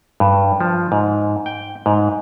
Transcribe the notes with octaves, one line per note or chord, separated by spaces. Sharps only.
G2
F3
G#2
G5
G#2